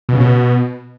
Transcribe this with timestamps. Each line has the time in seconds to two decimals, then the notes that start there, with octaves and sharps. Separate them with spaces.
0.09 B2
0.14 C#3
0.20 B2